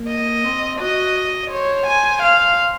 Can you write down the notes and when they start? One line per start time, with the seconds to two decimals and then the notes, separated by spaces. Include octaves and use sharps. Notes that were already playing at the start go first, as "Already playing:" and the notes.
Already playing: A#3
0.08 D#5
0.44 C4
0.80 F#4 D#5
1.51 C5 C#5
1.87 G#5
2.23 F5